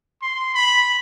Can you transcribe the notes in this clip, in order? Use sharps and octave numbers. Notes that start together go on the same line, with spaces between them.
C6
B5